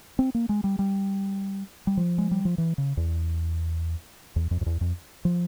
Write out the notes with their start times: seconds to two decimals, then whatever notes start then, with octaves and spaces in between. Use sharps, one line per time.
0.19 C4
0.35 A#3
0.49 G#3
0.64 G3
0.79 G3
1.87 G3
1.97 F3
2.18 G#3
2.31 G3
2.45 F3
2.58 E3
2.78 C#3
2.97 E2
4.36 E2
4.51 F2
4.61 F2
4.66 E2
4.81 F2
5.25 F3